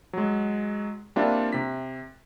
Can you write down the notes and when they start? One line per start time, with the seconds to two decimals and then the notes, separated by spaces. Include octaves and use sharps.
0.13 F#3 G#3
1.16 G3 A#3 C4 D4 F4 E5
1.53 C3 B6